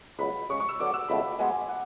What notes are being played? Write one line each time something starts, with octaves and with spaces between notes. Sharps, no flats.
C#2 B2 F#3 B5
C#3 G#3 C#4 C#6
C#6
E6
D3 F#3 B3 D4 D6
E6
C#2 B2 A3 B5
B2 G#3 B3 G#5
F#5